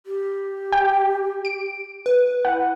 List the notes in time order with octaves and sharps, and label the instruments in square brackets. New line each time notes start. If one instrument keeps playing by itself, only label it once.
[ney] G4
[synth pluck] G5
D7
[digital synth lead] B4
[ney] E4 [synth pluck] F#5